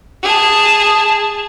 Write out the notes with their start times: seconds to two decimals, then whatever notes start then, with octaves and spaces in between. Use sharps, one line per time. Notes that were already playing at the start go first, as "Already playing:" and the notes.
0.23 G#4 A5